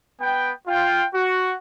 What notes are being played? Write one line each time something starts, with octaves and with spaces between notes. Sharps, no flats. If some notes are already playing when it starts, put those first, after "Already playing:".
B3 G5
F4 G5
F#4